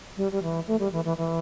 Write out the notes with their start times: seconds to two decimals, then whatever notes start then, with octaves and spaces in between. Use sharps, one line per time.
0.17 G3
0.32 G3
0.42 E3
0.67 A3
0.80 G3
0.92 E3
1.05 E3
1.17 E3